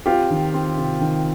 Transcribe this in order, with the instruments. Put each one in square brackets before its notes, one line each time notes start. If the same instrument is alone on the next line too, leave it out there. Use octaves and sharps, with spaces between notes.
[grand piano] C4 [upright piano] F4 G4
[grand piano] D#3
C4
C3
D#3